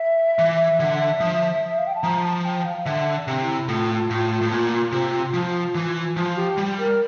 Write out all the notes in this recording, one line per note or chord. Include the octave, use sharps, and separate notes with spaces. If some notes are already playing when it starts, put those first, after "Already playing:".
Already playing: E5
E3
D3
F3
F5
G5
A5
F3 A#5
A5
G5
F5
D3 E5
C3
E4
A2 F4
A2
A2
A#2
C3
F3
E3
F3 F4
G4
G3
A#4